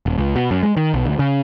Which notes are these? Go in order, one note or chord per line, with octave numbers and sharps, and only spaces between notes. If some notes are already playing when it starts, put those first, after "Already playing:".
D#1
C#2
B2
F#2
G#3
D#3
B1
D2
C#3